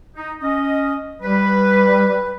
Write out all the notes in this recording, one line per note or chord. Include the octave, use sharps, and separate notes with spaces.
D#4
C#4 D#5
G3 B4